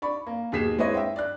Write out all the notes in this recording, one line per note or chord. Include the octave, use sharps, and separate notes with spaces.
D5 B5 C#6
A#3
D#2 B2 G#4 B6 C7 E7
G#3 C4 E4 B4 C#5 D#5
E5 G5
D5 F#6